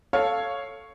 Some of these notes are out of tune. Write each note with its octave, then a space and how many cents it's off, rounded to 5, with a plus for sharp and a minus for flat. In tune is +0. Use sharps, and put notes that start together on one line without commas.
A4 +0 C#5 +0 F5 +0